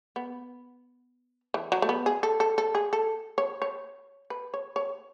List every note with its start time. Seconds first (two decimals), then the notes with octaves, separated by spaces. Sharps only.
0.16 B3
1.54 E3
1.72 F#3
1.82 A3
1.89 B3
2.06 G#4
2.23 A4
2.40 A4
2.58 A4
2.75 G#4
2.93 A4
3.38 C#5
3.62 C#5
4.30 B4
4.54 C#5
4.76 C#5